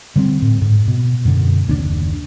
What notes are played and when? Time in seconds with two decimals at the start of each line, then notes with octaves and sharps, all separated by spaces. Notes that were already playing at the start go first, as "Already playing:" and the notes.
0.16 D3 G3 B3 C4
0.42 A2
0.61 G#2
0.88 B2
1.25 F#2 B2 D3
1.67 F#1 D#2 C#4 D4